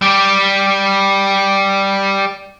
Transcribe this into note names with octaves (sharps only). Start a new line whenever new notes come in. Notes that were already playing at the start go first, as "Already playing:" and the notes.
G3 G4